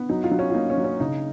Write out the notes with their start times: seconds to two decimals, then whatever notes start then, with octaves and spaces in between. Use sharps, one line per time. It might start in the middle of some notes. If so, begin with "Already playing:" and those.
Already playing: B3
0.09 F#3 D#4
0.24 F4
0.31 F#3
0.39 C#4
0.50 F4
0.54 A#3 D#4
0.70 C#4
0.78 F#3
0.84 C#4
1.00 C#3 D#4